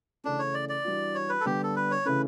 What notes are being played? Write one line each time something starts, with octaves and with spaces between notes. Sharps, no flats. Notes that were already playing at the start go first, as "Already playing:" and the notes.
C#3 E3 A3 C#4 D4
C#5
D5
D5
E3 G3 D4 F#4
C#5
B4
A4
D3 G3 B3 G4
A4
B4
C#5
C#3 E3 A3 C#4 B4